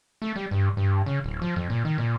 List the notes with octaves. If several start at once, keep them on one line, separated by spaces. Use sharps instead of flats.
A3
G3
G2
G2
C#3
D1
F3
F2
A#2
D#3
A#2